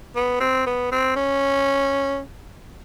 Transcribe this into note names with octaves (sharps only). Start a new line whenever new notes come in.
B3
C4
B3
C4
C#4